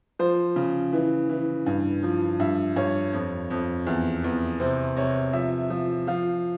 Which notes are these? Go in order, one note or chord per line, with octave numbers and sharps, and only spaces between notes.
F3 C5
C#3
E3
E3
G2
F3
G2 E5
G2 C#5
F2
F2
E2
E2
C3 C5
C3 C#5
F3 E5
F3
F3 F5